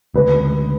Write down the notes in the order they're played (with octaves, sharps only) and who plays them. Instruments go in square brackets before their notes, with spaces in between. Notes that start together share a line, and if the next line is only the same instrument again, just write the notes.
[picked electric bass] D2 C#3 G#3 [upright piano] B4